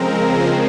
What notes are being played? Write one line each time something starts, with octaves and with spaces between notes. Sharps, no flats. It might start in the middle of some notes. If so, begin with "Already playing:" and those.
Already playing: C#3 F3 G#3 C4 A#4